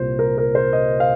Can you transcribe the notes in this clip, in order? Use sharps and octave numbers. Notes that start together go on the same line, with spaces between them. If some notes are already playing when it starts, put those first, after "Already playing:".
Already playing: C2 A#2 A#3 F4 C5
A#4
A#4
C5
D#5
F5